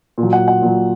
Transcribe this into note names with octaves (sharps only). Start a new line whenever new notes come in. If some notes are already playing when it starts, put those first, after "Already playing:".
A#2
F#3
F#5
F#5
A#2 F#3